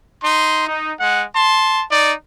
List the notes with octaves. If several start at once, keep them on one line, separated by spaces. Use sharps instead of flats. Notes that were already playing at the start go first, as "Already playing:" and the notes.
D#4 C6
D#4
G#3 F#5
A5 C6
D#4 D5